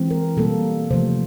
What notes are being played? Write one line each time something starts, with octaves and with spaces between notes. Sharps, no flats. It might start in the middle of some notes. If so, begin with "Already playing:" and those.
Already playing: E3 G#3 C4
A#4
B2 G3 A#3 A4
C3 F3 A3 C5